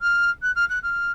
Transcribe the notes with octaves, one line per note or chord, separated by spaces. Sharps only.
F6
F#6
F6
F#6
F6